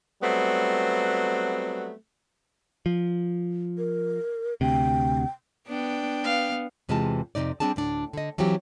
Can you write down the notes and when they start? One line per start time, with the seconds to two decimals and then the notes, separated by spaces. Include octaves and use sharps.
0.22 F#3 G3 A3 B3 C4
2.86 F3
3.78 A#4
4.61 D2 C3 G5
5.68 B3 D4 G5
6.24 B3 F5
6.89 E2 C3 E3 G#3 F4 A5
7.35 F2 G#2 C3 D#4 D5
7.60 G3 C4 D4 G#4 A5
7.76 D2 A2 D4
8.13 D3 D#5
8.38 E3 F#3 C4 F4 G4